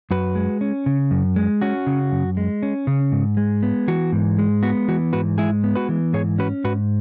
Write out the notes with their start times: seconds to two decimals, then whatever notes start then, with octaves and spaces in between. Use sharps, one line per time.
0.11 F#2 F#4 B4
0.35 G#3
0.61 C#4
0.86 C#3
1.11 F#2
1.36 G#3
1.62 C#4 F#4
1.87 C#3
2.12 F#2
2.37 G#3
2.63 C#4
2.87 C#3
3.12 G#2
3.37 G#3
3.63 B3
3.88 E3 F#4
4.12 G#2
4.39 G#3
4.63 B3 F#4
4.88 E3 F#4
5.13 G#2 F#4 B4
5.38 G#3 E4 G#4
5.64 B3
5.75 F#4 B4
5.89 E3
6.13 G#2 G#4 C#5
6.38 C#4 F#4 B4
6.64 G#2 F#4 B4